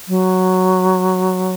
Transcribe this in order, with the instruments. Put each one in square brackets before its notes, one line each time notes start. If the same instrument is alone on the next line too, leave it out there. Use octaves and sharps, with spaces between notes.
[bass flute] F#3